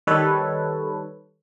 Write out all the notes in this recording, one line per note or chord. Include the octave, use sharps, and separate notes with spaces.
D#3 G3 A4 B4 C#5